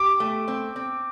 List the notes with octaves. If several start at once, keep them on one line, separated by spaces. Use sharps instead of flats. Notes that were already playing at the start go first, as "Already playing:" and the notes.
Already playing: G4 D6
A3
C4
C4